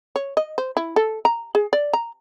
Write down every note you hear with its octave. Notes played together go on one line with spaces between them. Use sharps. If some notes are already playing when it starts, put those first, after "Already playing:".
C#5
D#5
C5
E4
A4
A#5
G#4
D5
A#5